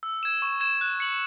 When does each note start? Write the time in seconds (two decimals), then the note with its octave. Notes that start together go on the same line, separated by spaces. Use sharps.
0.03 E6
0.23 G#6 E7
0.42 C#6
0.61 G#6 E7
0.81 F#6
1.00 C#7 F#7